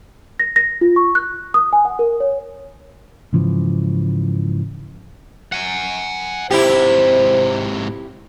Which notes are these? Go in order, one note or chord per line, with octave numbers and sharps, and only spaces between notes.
A#6
A#6
F4
C#6
F#6
D#6
G#5
F#5
A#4
C#5
G#2 C#3 E3 F3
F#5 G#5
G#2 C3 E4 G4 C5